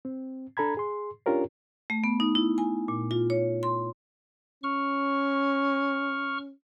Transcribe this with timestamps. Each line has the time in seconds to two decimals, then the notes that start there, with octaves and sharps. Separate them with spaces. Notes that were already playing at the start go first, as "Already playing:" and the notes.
0.05 C4
0.57 D4 A4 A#5 B5 G#6
0.77 G#4 C6
1.26 C#4 D4 F4 G4 A#4 C#5
1.90 A3
2.04 B3
2.20 D#4
2.35 E4
2.58 G#5
2.88 A#2
3.11 F4
3.30 C#5
3.63 C6
4.64 C#4 C#6 F6